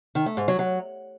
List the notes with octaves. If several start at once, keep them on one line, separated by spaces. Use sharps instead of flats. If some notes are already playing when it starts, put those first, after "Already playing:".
D#3
A3
G#2
F#3
F#3